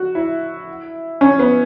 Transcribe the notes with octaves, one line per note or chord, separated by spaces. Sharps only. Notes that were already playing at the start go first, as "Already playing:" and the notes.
Already playing: F#4
E4
C#4
B3